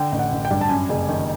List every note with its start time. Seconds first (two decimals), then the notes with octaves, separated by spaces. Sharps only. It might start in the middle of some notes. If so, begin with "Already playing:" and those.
Already playing: D3 G5
0.12 A1
0.19 F#5
0.32 A1
0.45 G5
0.51 G2
0.61 A5
0.69 F#2 G#5
0.89 F#1
1.09 D#3